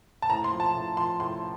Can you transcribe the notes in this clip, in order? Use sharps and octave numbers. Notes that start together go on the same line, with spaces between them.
A5
A2 A#5
C6
F3
A5
A2
F3 C6
A2 C6